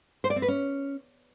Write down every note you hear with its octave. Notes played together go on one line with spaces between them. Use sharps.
C5
D5
C4
B4
C#4